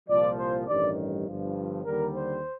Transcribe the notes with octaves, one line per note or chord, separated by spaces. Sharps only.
C2 A#2 F3 D5
C5
A1 G2 D#3 G3 D5
G1 G2 F3
D#2 D3 G3 A#4
C5